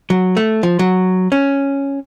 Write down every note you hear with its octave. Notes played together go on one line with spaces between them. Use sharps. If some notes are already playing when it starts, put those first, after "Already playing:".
F#3
A3
F3
F#3
C#4